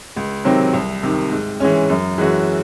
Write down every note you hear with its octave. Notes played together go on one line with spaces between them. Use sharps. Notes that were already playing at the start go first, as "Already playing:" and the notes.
C#2
C3 D#3 F#3 C4
C2
C3 D#3
G#2
E3 G#3 C#4
F#2
E3 G#3 C#4 F#4